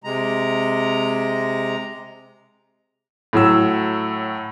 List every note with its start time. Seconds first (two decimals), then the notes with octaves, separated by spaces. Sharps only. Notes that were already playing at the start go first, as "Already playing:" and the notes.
0.04 C3 G#3 A#5
3.33 A2 F#3 E6